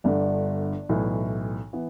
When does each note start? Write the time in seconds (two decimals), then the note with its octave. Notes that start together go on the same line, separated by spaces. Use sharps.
0.04 G1 G2 D3 D4
0.89 B1 A2 E3
1.73 E3 B3